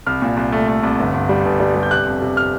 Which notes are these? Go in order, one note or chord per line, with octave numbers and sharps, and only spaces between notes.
C2 F6
A#2
C2
A3
A3
C2
G1
G1
G3
G1
G3
G3
G6
C3 F#6
F2
C3
F6